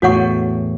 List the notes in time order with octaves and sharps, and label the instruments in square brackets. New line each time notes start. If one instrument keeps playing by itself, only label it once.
[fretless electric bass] E2 A2 [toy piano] F#4 C#5 F#5 C#6